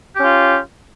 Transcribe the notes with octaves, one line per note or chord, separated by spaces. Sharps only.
C#4 F4 G4